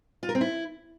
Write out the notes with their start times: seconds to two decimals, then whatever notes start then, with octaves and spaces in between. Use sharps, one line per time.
0.23 F4
0.29 A#4
0.35 C4
0.41 E4